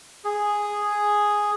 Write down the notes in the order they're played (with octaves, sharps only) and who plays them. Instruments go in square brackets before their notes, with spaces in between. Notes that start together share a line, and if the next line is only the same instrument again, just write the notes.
[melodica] G#4